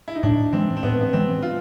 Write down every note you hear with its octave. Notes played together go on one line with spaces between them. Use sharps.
E4
D#4
A2 D4
E3 G#3 C4
C4
A2 B3
B3
E3 G#3 C4
F4